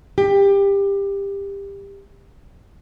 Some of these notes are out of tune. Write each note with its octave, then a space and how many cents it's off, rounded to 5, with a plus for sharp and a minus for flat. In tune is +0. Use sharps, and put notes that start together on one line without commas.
G4 +20